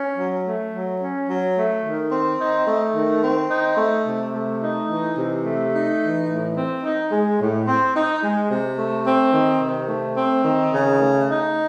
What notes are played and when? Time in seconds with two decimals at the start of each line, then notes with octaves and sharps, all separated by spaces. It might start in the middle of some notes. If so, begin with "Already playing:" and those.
Already playing: C#4
0.16 F#3
0.44 A3
0.73 F#3
1.00 C#4
1.28 F#3
1.56 A3
1.83 D#3
2.12 C4
2.39 D#4
2.67 A3
2.94 D#3
3.22 C4
3.50 D#4
3.77 A3
4.06 C3
4.34 A3
4.61 D#4
4.89 E3
5.17 C3
5.44 A3
5.72 D#4
6.00 E3
6.28 A2
6.55 C4
6.83 D#4
7.11 G#3
7.39 A2
7.67 C4
7.94 D#4
8.22 G#3
8.49 C3
8.78 A3
9.05 C4
9.32 D#3
9.61 C3
9.88 A3
10.16 C4
10.45 D#3
10.72 C#3
10.99 A3
11.28 D#4